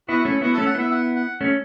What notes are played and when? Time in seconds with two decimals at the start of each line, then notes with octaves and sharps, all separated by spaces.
0.08 B3 E4 F#4
0.24 A3 C#4 E4
0.41 B3 E4 F#4
0.54 A4
0.58 A3 C#4
0.66 F#5
0.74 B3 E4 E5
0.92 F#5
1.16 F#5
1.41 A3 C#4